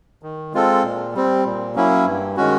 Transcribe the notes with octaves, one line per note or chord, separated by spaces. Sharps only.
D#3
G#3 C4 F4 A4
A#2
G3 C4
A#2
F#3 A#3 C#4 E4
G2
D#3 G#3 C#4 F#4